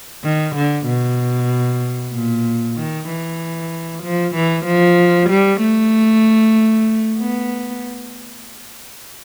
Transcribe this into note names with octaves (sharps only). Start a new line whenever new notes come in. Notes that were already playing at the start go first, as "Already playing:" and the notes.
D#3
D3
B2
A#2
D#3
E3
F3
E3
F3
G3
A3
B3